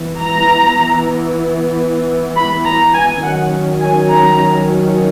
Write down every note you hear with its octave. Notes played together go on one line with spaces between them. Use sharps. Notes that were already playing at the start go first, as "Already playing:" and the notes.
Already playing: E3 B3
A#5
B5
A#5
G#5
D#3 F#3 C#4 F#5
G#5
A#5